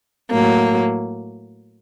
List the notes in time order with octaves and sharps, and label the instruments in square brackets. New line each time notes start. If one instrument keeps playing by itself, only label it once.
[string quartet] A2 F#3 A#3